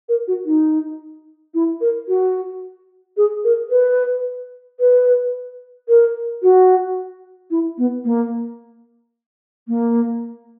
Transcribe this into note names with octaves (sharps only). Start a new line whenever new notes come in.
A#4
F#4
D#4
E4
A#4
F#4
G#4
A#4
B4
B4
A#4
F#4
E4
B3
A#3
A#3